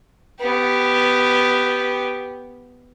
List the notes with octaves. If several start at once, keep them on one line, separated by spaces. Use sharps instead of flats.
B3 G4